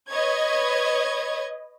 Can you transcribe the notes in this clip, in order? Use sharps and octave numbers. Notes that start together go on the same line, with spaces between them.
B4 C#5 D#5 G#6